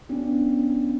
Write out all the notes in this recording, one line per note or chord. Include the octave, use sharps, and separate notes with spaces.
B3 C#4 D4